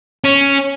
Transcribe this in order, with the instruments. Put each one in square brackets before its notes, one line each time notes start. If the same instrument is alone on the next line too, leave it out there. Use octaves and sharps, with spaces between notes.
[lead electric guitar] C#4